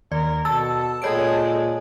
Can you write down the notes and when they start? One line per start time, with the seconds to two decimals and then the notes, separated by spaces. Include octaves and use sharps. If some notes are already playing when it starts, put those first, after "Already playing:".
0.12 D#2 A#4 D5
0.45 B2 A4 A5 E6
1.02 A#2 G#3 A4 C#5 D7